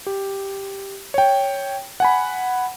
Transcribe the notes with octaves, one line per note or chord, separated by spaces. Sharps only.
G4
C#5 G5
F#5 G#5 B5